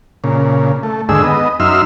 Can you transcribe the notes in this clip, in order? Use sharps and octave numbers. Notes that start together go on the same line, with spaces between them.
A#2 C#3
A3
D#2 G#2 D3 G#4 E6
B3 D#5
F#2 D#4 E5 C6 E6 F6